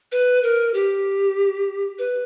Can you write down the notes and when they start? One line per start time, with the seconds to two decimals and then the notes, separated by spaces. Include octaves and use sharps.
0.12 B4
0.43 A#4
0.74 G4
1.99 B4